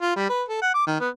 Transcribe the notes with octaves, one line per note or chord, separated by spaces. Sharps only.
F4
G3
B4
A4
F#5
D6
D#3
B3